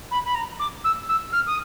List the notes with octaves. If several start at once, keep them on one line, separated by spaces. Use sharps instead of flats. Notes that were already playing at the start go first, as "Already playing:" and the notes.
B5
B5
A#5
D6
E6
E6
F6
D#6